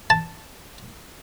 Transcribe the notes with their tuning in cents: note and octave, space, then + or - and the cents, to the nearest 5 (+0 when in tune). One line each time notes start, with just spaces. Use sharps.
A5 +0